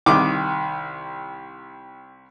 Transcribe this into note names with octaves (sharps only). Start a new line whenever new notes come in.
C2 D#3 D6